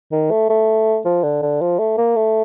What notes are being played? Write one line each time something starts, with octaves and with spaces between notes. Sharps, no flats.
D#3
A3
A3
F3
D3
D3
F3
A3
A#3
A3